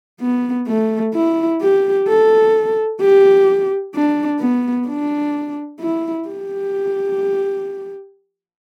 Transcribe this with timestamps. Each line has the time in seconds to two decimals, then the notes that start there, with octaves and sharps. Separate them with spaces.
0.21 B3
0.68 A3
1.15 E4
1.62 G4
2.08 A4
3.01 G4
3.95 D4
4.40 B3
4.88 D4
5.80 E4
6.28 G4